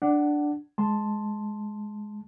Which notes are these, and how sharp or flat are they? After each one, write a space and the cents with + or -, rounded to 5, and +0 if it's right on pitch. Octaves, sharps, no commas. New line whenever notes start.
D4 +0 F#5 +20
G#3 +5 A5 +0 C6 +0